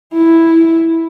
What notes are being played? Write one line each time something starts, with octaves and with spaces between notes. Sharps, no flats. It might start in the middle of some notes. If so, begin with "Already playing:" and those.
E4